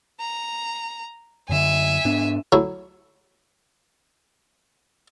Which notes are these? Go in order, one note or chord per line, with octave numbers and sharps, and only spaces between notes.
A#5
F#2 D3 E5 G#5
G#2 B3 D4
F#3 A3 E4